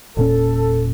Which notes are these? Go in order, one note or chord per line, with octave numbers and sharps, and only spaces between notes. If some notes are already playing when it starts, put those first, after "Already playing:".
E1 A#2 C#4 A4